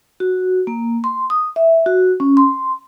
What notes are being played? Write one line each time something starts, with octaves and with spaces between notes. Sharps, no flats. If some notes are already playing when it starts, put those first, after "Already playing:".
F#4
A#3
C6
D#6
E5
F#4
C#4
C6